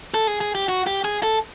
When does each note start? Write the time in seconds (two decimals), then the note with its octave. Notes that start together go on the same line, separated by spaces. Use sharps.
0.14 A4
0.27 G#4
0.41 G#4
0.55 G4
0.69 F#4
0.87 G4
1.05 G#4
1.23 A4